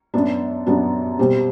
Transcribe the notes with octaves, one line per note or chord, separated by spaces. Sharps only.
F#2 F#3 B3 D4
F#2 F#3 B3 D4
B2 G3 C4